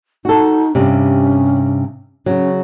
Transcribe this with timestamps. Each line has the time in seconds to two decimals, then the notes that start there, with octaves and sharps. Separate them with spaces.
0.25 D#4 F#4 A4
0.75 G2 C3 C#4
2.26 C#3 F#3 C#4